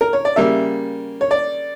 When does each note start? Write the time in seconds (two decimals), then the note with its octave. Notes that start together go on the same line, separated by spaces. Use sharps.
0.01 A#4
0.13 C#5
0.25 D5
0.36 C#3 G3 A#3 E5
1.21 C#5
1.31 D5